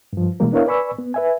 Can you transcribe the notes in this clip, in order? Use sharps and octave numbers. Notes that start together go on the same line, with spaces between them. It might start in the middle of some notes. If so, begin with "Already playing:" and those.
G2 F3
B2 E3 G3 G#3 A#3 A#4
B3 D4 E4 A#4 C#5 F5
B4 D5 G#5 B5 C#6 E6
B3
B4 E5 G#5